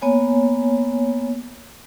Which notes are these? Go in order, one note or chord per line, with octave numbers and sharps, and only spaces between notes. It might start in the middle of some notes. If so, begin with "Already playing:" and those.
A#3 B3 C#5 G#5